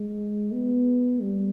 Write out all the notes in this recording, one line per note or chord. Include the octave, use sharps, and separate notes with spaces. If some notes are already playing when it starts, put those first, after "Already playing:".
Already playing: G#3
B3
G3